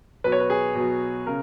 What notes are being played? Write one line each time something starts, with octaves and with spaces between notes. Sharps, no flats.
B2 F#3 B4
C#5
B4
G#4
B2 F#3
C#3 A#4